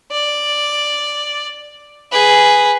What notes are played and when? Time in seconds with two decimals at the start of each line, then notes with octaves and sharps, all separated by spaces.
0.12 D5
2.12 G#4 B4